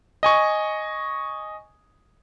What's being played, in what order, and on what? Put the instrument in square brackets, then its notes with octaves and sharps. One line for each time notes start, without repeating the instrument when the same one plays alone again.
[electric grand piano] D#5 G#5 C#6